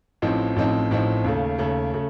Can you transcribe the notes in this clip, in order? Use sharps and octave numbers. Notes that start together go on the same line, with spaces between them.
A1 A2 F3 C4 D#4
A1 A2 F3 C4 D#4
A1 A2 F3 C4 D#4
D#2 C#3 A3
D#2 C#3 A3
C#3 A3